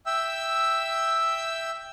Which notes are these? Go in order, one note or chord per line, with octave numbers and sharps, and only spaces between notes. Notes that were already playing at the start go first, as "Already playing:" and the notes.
E5 G5 E6